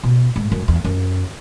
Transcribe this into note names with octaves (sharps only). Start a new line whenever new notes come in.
B2
G#2
F#2
E2
F#2